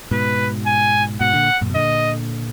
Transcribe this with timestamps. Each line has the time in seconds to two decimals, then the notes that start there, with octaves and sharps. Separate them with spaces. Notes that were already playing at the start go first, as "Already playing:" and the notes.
0.11 G#2 B2 B4
0.66 G#5
1.20 G#2 B2 F#5
1.34 A#2 D3
1.61 F#2 A#2
1.70 B2
1.75 A#2 D3 D#5